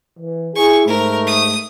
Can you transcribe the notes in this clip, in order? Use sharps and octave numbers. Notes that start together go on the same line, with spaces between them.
E3
E4 G#4 C#6
G#2 A3 A#4
D#6